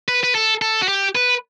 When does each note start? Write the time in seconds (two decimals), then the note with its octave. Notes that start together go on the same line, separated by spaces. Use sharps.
0.08 B4
0.23 B4
0.35 A4
0.62 A4
0.82 F#4
0.88 G4
1.15 B4